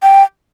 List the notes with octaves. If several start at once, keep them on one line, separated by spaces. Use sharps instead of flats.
G5